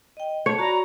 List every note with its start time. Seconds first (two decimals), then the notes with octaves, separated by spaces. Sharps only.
0.17 D#5 G5
0.46 C#5 A5
0.58 F#4 D5 A#5 B5